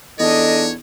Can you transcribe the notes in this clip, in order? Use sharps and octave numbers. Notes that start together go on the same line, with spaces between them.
E2 D4 D#4 A4 C#5 D#5